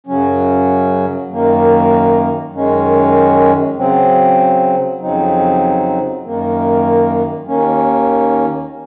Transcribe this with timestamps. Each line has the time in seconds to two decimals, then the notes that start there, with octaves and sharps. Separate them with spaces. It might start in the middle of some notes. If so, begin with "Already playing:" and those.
0.07 F#2 C#3 F#3 C#4
1.30 F#2 D#3 A#3
2.53 F#2 D#3 G#3 C#4
3.77 C#3 F#3 C4
5.00 F2 C#3 F#3 C4 D#4
6.24 F#2 D#3 A#3
7.47 D#2 D#3 A#3 C#4